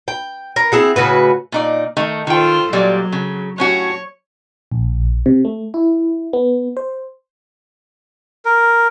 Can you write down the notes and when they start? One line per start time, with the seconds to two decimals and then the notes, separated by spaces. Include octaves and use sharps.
0.08 G5
0.56 A#4
0.72 C4 E4 G#4 F#5
0.96 A2 C#3 F#4 B4
1.52 A#2 D#4 D5
1.97 D#3 A3 D#4
2.27 D#3 F4 A4 C5 G5
2.73 A#2 F#3 G3 D5
3.12 C#3
3.58 A2 C#4 F#4 C#5
4.72 A#1
5.26 C3
5.45 A3
5.74 E4
6.33 B3
6.77 C5
8.45 A#4